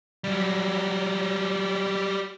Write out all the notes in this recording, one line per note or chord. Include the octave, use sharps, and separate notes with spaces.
F#3 G3